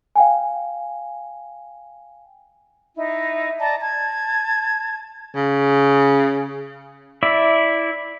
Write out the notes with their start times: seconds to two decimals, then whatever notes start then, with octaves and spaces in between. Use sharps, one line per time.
0.16 F5 G5 G#5
2.95 D#4 E4
3.59 D5 D#5 A5 A#5
3.79 A5 G#6
5.35 C#3
7.23 E4 D5 E5